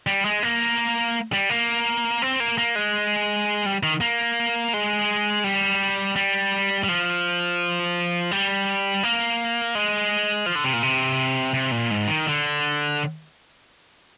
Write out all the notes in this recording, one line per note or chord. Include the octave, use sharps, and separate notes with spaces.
G3
G#3
A#3
G3
A#3
C4
A#3
A#3
G#3
G3
D#3
A#3
G#3
G3
G3
G3
F3
G3
A#3
G#3
F3
D3
C3
A#2
C3
C3
A#2
G#2
D#3
D3